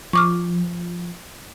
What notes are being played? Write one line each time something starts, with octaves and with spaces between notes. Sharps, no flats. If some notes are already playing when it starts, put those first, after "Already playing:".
F3 C#6 D6 F6